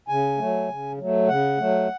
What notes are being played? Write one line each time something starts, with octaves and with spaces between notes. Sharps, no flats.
C#3 G#5
F#3 A3
C#3
F#3 A3
C#3 F#5
F#3 A3